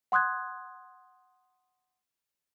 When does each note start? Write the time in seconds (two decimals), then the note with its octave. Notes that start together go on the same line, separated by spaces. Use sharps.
0.12 F#5 C6 D#6 F#6 G#6